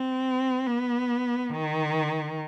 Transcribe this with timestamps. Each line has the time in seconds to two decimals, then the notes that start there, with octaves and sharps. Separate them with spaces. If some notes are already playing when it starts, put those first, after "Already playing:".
Already playing: C4
0.67 B3
1.49 D#3